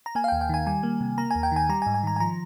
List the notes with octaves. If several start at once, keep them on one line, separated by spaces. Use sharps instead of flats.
A#5
A#3 G#5
F5
D#2 G5
G5
D#3 G#5
G3 G#5
A#3
C3
A#3 A#5
D#2 G#5
G5
D#3 G#5
G3 A#5
G#5
G#2
G#5
D#3 A#5
G#5
F3 A#5